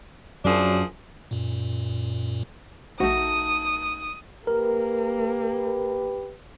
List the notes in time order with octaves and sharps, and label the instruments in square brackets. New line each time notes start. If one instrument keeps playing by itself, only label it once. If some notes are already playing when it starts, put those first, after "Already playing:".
[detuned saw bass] F#2 [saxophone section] F3 D4 G#4
[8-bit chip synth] F#2 A#2
[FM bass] A#1 [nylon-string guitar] A3 D#4 F#4 [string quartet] D#6
[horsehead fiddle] A#3 [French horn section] G4 B4 [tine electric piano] A#4